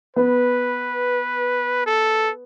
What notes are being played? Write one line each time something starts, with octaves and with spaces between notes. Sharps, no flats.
B3 B4
A4